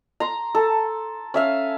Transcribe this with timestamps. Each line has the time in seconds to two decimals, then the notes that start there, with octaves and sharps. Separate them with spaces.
0.20 A#5 C6
0.55 A4
1.34 C#4 E5 F5